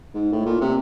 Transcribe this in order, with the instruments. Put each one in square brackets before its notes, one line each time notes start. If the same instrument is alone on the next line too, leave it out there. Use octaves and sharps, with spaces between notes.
[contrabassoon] G#2
A2
A#2
C3